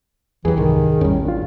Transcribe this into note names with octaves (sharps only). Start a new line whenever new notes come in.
E2 E3 F#3 G4 G#4
C2 G#2 C3 D#3
A1 E2 G3 C#4
D4 F4